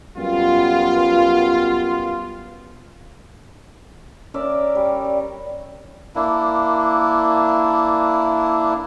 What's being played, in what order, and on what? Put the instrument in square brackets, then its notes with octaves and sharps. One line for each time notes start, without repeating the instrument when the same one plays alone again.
[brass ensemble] F#2 G3 B3 F4
[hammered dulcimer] C#4 A#4 D5 E5
G3
[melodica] A#3 D4 E4